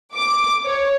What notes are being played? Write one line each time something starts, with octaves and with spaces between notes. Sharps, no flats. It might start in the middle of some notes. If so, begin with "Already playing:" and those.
D6
C#5